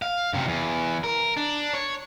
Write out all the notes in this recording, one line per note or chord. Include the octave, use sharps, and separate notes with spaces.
F5
F#2 C3
E2
A#4
D4
C#5